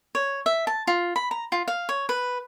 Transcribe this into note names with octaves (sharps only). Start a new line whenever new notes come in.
C#5
E5
A5
F4
B5
A#5
F4
F5
C#5
B4